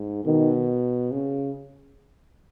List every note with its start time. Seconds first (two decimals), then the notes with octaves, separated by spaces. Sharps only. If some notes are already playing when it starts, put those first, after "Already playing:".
Already playing: G#2
0.25 B2 D#3
1.11 C#3